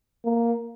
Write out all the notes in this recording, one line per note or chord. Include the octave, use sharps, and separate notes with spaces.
A#3